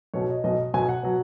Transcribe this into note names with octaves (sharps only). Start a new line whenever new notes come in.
B1 B2 F#3 C#5
D#5
B1 B2 F#3 D#5
B1 B2 F#3 G#5
F#5
B2 F#3